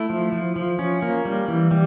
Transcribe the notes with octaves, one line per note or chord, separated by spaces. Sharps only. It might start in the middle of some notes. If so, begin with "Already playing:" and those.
Already playing: A3 E4
F3
F3
F3
C#4
A#3
G3
E3
G3